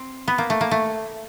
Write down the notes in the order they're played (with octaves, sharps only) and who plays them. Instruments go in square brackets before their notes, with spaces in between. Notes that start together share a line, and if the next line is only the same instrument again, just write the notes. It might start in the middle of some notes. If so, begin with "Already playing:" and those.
Already playing: [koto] C4
B3
A#3
A3
A#3
A3